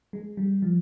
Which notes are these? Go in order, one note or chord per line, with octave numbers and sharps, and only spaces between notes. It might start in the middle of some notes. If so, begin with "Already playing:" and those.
G#3
G3
F3